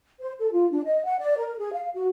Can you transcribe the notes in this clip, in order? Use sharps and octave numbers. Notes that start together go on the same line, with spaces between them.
C5
A4
F4
D4
D#5
F#5
D5
A#4
G#4
F5
F#4